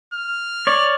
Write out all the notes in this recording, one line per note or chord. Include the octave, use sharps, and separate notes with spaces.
F6
C#5 D5